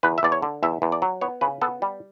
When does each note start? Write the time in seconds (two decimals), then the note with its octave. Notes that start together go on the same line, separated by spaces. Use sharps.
0.03 E2 B4
0.18 E5
0.23 E2 D5
0.32 C#5
0.42 D3
0.63 E2 E5
0.82 E2
0.92 D5
1.02 F#3
1.21 B3 C#5
1.41 C#3 B4
1.62 B3 A4
1.82 G3